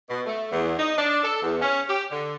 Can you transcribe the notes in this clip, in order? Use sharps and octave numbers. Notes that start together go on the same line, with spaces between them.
B2
A3
E2
D#4
D4
A4
E2
C#4
G4
D3